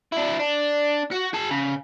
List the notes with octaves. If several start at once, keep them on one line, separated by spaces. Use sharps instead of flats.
D4 E4
D4
F#4
G#4 A5
C#3